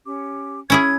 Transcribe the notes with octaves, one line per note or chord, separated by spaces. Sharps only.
C#4 G4 D6
C#4 E4 G#4 G#6